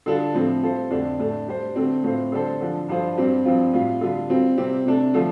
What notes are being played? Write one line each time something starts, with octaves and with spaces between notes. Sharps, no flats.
D3 G3 D4 F4 A4
A2 F3 C4
G3 F4 A4 C5
F2 D3 A3 D4
A2 A3 D4
G3 D4 G4 C5
D3 A3 C4
A2 A3 C4 F4 C5
D3 G3 D4 A4 C5
D3 F3 D4
G2 F3 D4 F4 C5
G2 G3 C4 G4 C5
G2 F3 C4 F4
A2 G3 F4
D3 G3 F4
G3 C4 F4
C3 G3 C4 G4
C3 A3 D4
D3 F3 A3